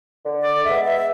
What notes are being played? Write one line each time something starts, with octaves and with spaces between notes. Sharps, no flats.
D3
D5
G#3 B3 E5
E5